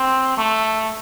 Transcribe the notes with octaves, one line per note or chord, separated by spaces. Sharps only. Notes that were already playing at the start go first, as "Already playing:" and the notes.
Already playing: C4
A3